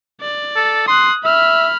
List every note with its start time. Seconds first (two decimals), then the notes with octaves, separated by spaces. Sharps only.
0.22 D5
0.56 A4
0.88 C6 D#6 F#6
1.24 E5 B5 F6